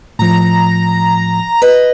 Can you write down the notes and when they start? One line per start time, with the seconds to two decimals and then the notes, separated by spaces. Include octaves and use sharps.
0.19 A2 F3 A#5
1.62 B4 D#5